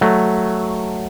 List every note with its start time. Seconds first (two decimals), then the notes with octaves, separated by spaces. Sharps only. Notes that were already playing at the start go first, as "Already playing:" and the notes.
0.01 F#3 A3